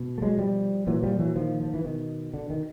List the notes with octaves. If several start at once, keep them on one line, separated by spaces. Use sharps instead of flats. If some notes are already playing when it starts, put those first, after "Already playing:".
Already playing: B2
A3
F#3 G#3
F3 G3
A#2 E3 F#3
F3 G3
E3 F#3
D#3 F3
F3
E3
B2 D#3
D3
D#3